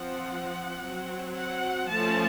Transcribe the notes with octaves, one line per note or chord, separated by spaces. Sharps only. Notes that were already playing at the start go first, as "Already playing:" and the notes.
Already playing: F3 C4 F#5
F#3 C4
F#5
F3 A3 C#4 A5